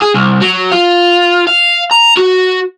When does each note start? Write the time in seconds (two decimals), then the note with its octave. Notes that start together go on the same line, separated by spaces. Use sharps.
0.02 G#4
0.14 C2
0.41 F#3
0.72 F4
1.47 F5
1.91 A#5
2.17 F#4